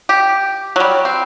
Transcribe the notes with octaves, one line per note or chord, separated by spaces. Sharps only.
G4
F#3 G3
C4